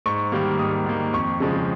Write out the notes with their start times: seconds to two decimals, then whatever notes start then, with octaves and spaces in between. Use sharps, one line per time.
0.06 G#2 C#6
0.32 D#3 G3 A#3
0.59 G#2 D#6
0.86 D#3 G3 A#3
1.13 F2 C#6
1.40 C#3 F3 G#3